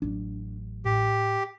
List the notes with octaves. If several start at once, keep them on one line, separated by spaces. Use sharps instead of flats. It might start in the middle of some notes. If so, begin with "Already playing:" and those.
A1 F#3 D4
A2 G4